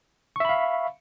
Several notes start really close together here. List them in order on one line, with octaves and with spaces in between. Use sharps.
C#6 E5 B5 F5